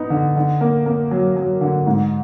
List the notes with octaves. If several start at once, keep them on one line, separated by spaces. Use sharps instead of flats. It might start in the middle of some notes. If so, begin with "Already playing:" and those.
Already playing: B3 D#4
D3
D3
A#3
A#3
F#3
F#3
D3
G#2